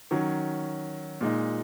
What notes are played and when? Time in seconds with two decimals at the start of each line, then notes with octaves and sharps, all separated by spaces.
0.11 D#3 F#3 C#4
1.21 A#2 G#3 D#4